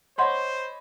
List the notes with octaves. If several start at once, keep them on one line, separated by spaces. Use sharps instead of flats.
C5 C#5 D#5 F#5 B5 C6 G6